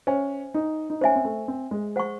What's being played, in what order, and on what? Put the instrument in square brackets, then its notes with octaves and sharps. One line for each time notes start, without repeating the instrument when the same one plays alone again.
[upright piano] C#4 [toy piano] C5 E5 G#5
[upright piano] D#4
D#4
[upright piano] C#4 [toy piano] C5 E5 G#5
[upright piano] C4
A3
C4
G#3
[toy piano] C5 F#5 C#6